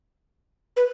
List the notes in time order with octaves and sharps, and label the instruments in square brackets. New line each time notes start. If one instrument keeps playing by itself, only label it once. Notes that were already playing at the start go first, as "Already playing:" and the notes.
[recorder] B4